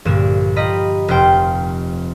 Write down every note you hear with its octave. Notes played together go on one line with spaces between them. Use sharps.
A#1 G2 D3 A#3 E7
F4 G4 D#5 A#5 B5
F1 F4 C5 G5